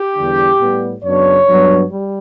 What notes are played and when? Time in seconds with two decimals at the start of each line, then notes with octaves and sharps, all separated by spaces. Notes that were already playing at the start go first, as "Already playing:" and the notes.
Already playing: G4
0.15 E2 D3 G3 D4
0.58 A2 G3 B3
1.02 F#2 C#3 F#3 B3 D4 C#5
1.47 G2 F#3 B3 D4
1.90 G3